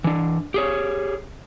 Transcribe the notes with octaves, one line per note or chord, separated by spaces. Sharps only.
E3 D4
G4 G#4 C#5